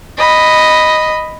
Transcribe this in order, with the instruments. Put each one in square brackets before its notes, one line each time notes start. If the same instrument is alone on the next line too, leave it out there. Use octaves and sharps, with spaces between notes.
[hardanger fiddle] D#5 B5